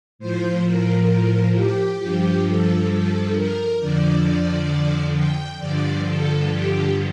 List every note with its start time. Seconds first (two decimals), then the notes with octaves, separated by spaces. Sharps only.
0.19 A2 F3 C5
0.65 A#4
1.55 G4
1.98 G2 F3 G4
2.45 A4
2.89 A4
3.34 A#4
3.79 F2 D3 F3 D5
5.13 G5
5.58 G2 D3 F3 D5
6.04 A4
6.48 G4